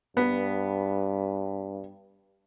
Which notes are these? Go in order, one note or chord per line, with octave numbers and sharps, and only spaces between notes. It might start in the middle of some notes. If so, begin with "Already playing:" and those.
G2 B3